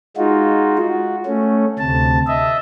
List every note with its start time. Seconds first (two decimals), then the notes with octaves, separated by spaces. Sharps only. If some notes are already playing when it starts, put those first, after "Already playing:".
0.17 G#3 D#4 F4 F#4
0.78 F#4
1.26 A3 C#4
1.79 D2 C3 A5
2.27 D#5 E5